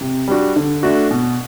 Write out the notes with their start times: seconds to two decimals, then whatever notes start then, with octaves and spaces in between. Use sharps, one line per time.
0.01 C3
0.28 G3 D4 F#4
0.56 D3
0.83 A3 D4 F#4
1.11 B2